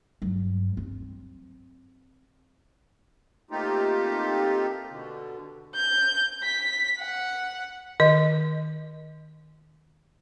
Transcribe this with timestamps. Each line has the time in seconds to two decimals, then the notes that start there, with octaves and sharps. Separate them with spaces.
0.22 G2 F#3
0.77 C4
3.51 A3 A#3 C4 D#4 F4 G4
4.90 B2 D3
5.75 G6
6.44 B6
7.00 F#5
8.00 D#3 D#5